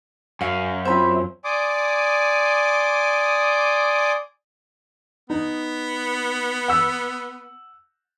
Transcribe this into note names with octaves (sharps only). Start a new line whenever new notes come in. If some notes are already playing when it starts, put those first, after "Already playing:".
F#2 F#4 F5
C4 F4 E5 B5
D5 G#5 C6 D6 D#6
B3 D#4
F#5 E6